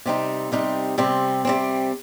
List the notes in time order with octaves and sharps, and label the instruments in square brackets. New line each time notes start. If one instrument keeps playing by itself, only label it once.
[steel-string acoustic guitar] C3 G3 C4 D#4
C3 G3 C4 D#4
C3 G3 C4
C3 G3 C4